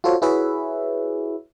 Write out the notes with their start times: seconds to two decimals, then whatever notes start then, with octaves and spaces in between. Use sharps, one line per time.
0.04 F4 F#4 A4 C5 C#5
0.22 E4 F#4 G#4 B4 C#5 E5